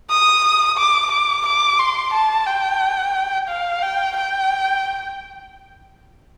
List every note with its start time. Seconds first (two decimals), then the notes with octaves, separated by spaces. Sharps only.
0.10 D#6
0.78 D6
1.11 D6
1.46 D6
1.79 C6
2.13 A5
2.46 G5
3.48 F5
3.82 G5
4.16 G5